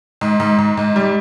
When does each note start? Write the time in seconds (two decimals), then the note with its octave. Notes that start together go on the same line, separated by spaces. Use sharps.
0.21 G#2
0.40 G#2
0.59 G#2
0.77 G#2
0.96 G3